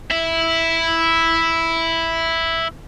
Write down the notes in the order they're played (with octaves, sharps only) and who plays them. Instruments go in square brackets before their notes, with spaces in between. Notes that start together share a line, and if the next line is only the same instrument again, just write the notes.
[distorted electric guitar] E4 E5